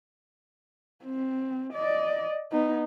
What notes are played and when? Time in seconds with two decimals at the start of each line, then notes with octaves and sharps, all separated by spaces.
1.04 C4
1.73 D5 D#5
2.52 B3 D#4